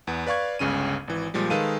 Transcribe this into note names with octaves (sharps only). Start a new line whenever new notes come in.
E2 B3
B4 D5 F5 C#6 G#6
G1 C#2 C#3 C#4 D#7
G#1 E3
A#2 F3 G3 G#3
D#3 G#3 A4 B4 F5 D#7